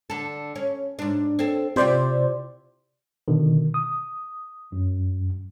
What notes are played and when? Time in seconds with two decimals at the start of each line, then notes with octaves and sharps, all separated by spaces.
0.10 D3 A4
0.56 C#4
0.99 G#2 D4
1.39 C4 A4
1.76 C3 E4 F4 G4 C5 D5
3.28 B2 D3 D#3
3.74 D#6
4.72 F#2